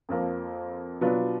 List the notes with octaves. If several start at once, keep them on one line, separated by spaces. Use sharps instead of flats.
F2 F3 A#3
B2 F#3 B3 D4 F4